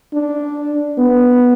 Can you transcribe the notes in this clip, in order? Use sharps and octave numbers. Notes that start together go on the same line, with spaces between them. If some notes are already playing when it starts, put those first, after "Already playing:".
D4
B3